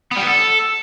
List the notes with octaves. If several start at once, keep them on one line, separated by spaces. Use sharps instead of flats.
B3
G3
B3
A4